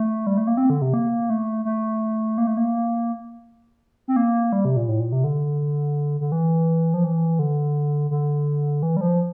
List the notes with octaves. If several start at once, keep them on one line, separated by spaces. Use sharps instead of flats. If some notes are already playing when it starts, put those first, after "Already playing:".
Already playing: A3
G3
A3
A#3
C4
D3
C3
A#3
A3
A3
A#3
A3
A#3
C4
A#3
G3
C3
A#2
A2
A#2
C3
D3
D3
E3
F3
E3
D3
D3
E3
G3
F3